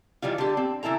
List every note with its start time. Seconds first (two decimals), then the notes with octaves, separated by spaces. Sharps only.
0.22 D#3 E3 G3 F4
0.38 D3 G4
0.57 C4
0.83 C#3 E3 E4 A4 A#5